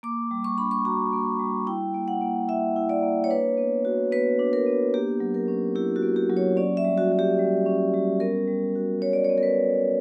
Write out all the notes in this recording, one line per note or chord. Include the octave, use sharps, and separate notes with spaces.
A#3 D6
G3
C#6
D4 B5
C#6
F#4 A#5
A#3
G3
E4 G5
A#3
F#5
A#3
E4 E5
E4
D5
A#3
C#5
D4 B4
B3
F#4
B3 B4
D4
A#4
B3
A#3 G4
F#3
A#4
C#4
E4 G4
F#4
A#3
G4
F#3
C#5
C#4 D5
E5
G3
F#4
F#4
G4
G3
C#4
G3
B3 A#4
G3
F#4
G3 C#5
D5
B3 C#5
A#4
B4